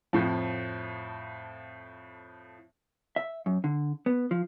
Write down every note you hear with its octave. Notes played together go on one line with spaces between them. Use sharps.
F2 A2 F3
E5
F#2
D3
B3
F3